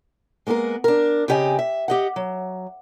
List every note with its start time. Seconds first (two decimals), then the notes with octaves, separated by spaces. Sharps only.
0.47 G#3 A#3 B3 G4 A#4
0.84 D4 A#4
1.28 C#3 C4 G4 D#5 G#5
1.59 E5
1.88 G4 D#5 F#5
2.16 F#3